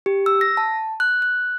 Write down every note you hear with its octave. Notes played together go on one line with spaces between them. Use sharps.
G4
E6
A#6
A5
F#6
F#6